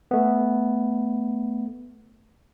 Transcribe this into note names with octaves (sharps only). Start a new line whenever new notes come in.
A3 B3